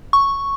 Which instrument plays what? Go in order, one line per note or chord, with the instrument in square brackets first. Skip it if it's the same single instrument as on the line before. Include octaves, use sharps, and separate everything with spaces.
[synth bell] C#6